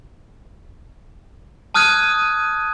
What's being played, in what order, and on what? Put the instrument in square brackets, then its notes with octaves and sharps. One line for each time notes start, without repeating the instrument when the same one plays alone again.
[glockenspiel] A5 D#6 F6 F#6 G#6 D#7